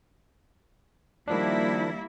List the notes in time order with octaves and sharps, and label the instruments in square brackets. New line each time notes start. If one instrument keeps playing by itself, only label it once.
[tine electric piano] D#3 F3 D4 [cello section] G3 A#3 E4